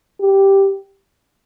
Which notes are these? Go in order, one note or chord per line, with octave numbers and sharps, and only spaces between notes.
G4